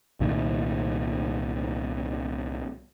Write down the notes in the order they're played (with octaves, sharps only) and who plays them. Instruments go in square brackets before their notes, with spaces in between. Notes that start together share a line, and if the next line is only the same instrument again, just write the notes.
[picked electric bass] C2 A#2 D#3